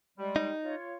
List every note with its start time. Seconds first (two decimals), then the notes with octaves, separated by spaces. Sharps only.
0.19 G3 G#3
0.36 D#4
0.64 F4 C#5